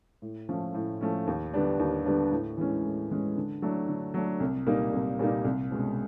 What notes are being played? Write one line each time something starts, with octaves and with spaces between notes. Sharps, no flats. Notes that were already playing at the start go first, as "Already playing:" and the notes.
A2
F3 A3 C#4
A2
F3 A3 C#4
D#2
D3 G3 B3 D4
D#2
D3 G3 B3 D4
A2
E3 G#3 C#4
A2
E3 G#3 C#4
D3
F#3 A3 D4
D3
F#3 A3 D4
C2
A#2 G3 A#3 D#4
C2
A#2 G3 A#3 D#4
C2
B2 G#3 C#4